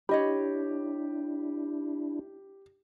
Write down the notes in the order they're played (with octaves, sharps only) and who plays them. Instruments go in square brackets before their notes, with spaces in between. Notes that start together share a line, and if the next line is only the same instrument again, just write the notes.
[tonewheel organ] D4 E4 [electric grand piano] G4 [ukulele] C#5 D#5 B5